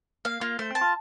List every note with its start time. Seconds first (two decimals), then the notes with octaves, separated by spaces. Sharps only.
0.25 A#3 F5
0.41 A#3 F4
0.59 A3 C5
0.71 C4 A5
0.81 F4